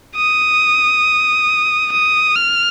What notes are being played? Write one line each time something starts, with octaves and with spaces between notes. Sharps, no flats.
D#6
D#6
F6